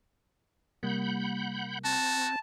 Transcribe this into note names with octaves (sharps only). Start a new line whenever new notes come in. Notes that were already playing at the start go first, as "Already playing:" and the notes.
C3 G3 A#3 F#5 B5 G6
C4 F#4 A5